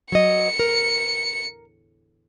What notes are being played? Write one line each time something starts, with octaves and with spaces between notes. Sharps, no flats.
F#3 D#5 C#7
A#4